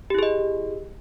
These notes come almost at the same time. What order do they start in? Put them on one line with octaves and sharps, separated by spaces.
G4 E4 G#4 D#5